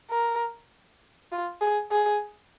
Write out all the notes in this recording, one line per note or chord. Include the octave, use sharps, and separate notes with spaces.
A#4
F4
G#4
G#4